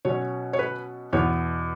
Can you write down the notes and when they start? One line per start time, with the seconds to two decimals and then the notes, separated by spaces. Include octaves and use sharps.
0.05 B2 F#3 C#4 C#5
0.53 C#5
0.59 B4
1.13 E2 B2 B3 C#5